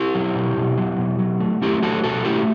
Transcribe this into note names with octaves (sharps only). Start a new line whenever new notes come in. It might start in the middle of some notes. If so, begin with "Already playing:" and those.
Already playing: E4 G4
F#3
B2
B2
F#3
B2
F#3
A3
A3 E4 G4
F#3 F#4 A4
B2 F#4 A4
A3 E4 G4